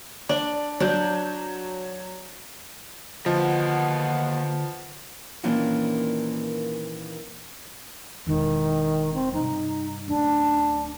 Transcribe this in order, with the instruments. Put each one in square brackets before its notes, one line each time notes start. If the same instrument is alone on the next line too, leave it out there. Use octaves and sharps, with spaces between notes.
[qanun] D4 [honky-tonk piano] D5
[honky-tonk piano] F#3 G6 [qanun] D4
[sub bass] D3 [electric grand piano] F3 [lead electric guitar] A#3 D#5 [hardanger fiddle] B3 F#4
[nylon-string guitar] A#2 D#3 E3 A#3 C#4 D4
[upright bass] E1 E4 [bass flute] D#3
[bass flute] C4
[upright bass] G2 C3 [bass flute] D#4
[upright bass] D1 C#4 [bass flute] D4